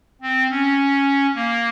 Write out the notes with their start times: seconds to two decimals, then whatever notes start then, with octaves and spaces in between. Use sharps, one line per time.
0.22 C4
0.51 C#4
1.35 A#3